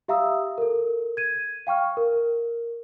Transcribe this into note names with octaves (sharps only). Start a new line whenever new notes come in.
G4 E5 F5 A#5 D#6 E6
A4 A#4
G#6 D#7
F5 G5 C#6 F6
A#4